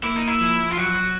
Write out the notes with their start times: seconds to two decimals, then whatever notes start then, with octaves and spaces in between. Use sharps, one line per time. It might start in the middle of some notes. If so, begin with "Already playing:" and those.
0.03 A#3 E4
0.16 D#4
0.28 E4
0.40 F3
0.71 F4
0.77 F#3 F#4